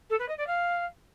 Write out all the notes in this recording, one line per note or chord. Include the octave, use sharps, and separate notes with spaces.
A4
B4
D#5
D5
F5